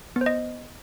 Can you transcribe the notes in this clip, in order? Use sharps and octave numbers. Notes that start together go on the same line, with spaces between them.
B3
C5
D#5